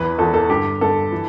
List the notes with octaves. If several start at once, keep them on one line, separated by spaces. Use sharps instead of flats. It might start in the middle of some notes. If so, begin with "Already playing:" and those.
Already playing: E2 E3 B4
E2 E3 A4
A4
G2 D3 G4
G2 D3 A4
E3